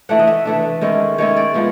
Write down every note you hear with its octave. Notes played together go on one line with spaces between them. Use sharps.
E3 A3 D4 F#5
D#5
E5
E3 A3 D4
D#3 G#3 C#4 E4
D#3 G#3 C#4 E4 C#5
D5
F3 G#3 B3